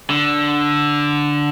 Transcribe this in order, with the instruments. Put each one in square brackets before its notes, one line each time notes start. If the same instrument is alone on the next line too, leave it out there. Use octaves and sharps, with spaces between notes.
[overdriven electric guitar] D3